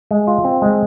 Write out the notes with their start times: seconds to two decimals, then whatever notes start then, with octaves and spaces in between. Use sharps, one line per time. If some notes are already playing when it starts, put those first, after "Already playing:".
0.11 G#3
0.27 F4
0.44 C4
0.62 G#3